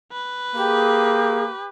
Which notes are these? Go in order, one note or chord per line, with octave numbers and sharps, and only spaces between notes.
B4
A#3 G4 G#4